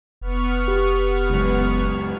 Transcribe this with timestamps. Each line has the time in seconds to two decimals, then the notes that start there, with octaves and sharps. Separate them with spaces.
0.21 F1 B3 C#6 F6
0.68 G4
1.30 C#2 F#2